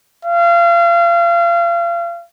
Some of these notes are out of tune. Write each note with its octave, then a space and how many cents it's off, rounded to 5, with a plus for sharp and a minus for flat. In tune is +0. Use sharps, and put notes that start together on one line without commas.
F5 -35